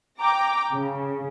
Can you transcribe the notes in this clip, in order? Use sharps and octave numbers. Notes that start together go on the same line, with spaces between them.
G5 A#5 D6
C#3